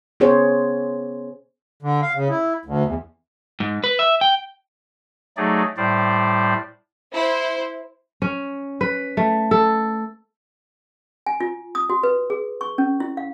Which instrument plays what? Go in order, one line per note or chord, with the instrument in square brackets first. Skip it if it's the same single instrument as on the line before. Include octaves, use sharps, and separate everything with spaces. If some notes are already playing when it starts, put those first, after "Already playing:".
[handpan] B3 C#4 G#4 C5 C#5
[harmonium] D3
F5
C#3
E4
D2
E2
[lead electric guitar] G#2
B4
E5
G5
[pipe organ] F#3 A3 D#4 G#4 D5
A2 G3 C5 D5
[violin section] E4 C5
[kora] C#4
B4
A3
A4
[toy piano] G#5
F4
D#6
F#4
B4
G#4
C#6
C#4
E4
F5